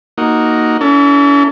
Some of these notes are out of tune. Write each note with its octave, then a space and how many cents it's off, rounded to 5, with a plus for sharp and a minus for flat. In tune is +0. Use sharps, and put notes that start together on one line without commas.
A#3 +0 D#4 +0 F#4 +0
C#4 +45 E4 +0 A4 +35